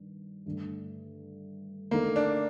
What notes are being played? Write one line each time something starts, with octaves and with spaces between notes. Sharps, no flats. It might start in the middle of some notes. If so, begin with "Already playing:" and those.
Already playing: G2 D#3
G2 D3 A3
D3 A3 A#3 D#4
D4